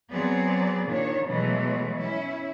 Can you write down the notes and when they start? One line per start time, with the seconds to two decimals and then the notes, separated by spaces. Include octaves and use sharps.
0.11 F#3 B3 C4 G#4 D5
0.87 A#2 D#3 D4 C#5
1.26 B2 E3 F#3 G#3 A3
1.98 C#4 E4